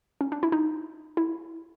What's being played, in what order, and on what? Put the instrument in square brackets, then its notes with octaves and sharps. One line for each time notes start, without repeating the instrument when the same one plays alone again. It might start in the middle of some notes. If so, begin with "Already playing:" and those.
[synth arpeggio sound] C#4
D4
E4
D#4
E4